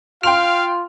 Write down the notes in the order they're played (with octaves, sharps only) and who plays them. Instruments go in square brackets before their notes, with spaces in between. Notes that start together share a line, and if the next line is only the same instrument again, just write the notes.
[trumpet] F4 [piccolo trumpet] F5 [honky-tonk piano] G5 C6 F7 [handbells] F6